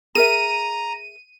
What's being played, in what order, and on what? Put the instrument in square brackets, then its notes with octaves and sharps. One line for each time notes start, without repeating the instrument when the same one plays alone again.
[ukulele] G#4 A#4 E5 [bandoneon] A#5 [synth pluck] D#7